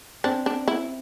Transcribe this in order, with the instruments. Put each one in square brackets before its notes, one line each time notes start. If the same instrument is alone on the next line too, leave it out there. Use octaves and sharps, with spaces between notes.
[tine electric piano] C4 [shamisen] D4
[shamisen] D4
E4